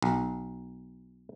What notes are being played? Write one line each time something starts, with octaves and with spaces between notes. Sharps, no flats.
B1